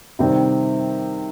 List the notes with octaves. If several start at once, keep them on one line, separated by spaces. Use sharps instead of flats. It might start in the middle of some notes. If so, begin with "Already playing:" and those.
C3 D#3 G3 C4